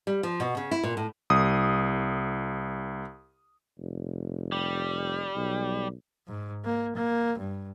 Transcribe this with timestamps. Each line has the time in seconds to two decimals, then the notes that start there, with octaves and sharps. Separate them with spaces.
0.07 G3
0.23 F3
0.40 B2
0.57 C#3
0.71 E4
0.83 A#2
0.97 A2
1.30 C2 D#6
3.79 F1
4.52 G3
5.36 B1
6.28 G#2
6.65 A#3
6.96 A#3
7.39 G2